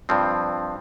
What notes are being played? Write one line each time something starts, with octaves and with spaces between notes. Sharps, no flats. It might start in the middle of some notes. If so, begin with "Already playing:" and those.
G2 F3 C4